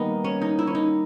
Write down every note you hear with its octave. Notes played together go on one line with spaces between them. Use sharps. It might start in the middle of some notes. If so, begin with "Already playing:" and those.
Already playing: D#3 G3 A#3 B3 D#4
C#4
D#4
E4
C#4
D#4